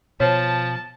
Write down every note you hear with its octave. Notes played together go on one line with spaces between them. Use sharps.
B2 F3 C5 C#5 A5